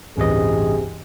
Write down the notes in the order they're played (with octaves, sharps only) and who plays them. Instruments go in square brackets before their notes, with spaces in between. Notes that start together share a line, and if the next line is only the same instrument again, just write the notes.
[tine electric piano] A1 D#5 [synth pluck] D2 G2 E3 [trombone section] C3 C4 G#4